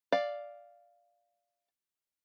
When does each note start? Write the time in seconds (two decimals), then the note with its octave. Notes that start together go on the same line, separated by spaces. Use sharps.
0.12 D5 F5